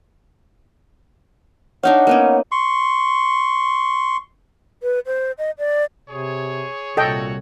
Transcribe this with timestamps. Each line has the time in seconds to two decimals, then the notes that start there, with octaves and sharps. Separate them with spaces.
1.83 D4 D#4 C#5 F5 F#5
2.07 A#3 B3 C#4
2.52 C6 C#6
4.83 B4
5.06 C5
5.38 D#5
5.58 D5
6.09 C3 G#4 C#5
6.97 C2 A#2 A3 F#4 A4 C#5 D#5 G5